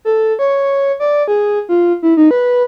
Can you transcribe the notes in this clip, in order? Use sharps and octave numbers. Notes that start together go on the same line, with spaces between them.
A4
C#5
D5
G#4
F4
E4
D#4
B4